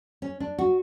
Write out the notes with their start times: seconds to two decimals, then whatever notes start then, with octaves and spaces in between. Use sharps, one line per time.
0.22 C#4
0.40 D4
0.58 F#4